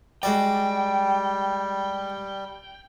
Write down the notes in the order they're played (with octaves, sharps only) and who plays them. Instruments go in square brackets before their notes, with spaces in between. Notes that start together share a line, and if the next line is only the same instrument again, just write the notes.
[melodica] G3 [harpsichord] G#3 F#4 D5 [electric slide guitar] G5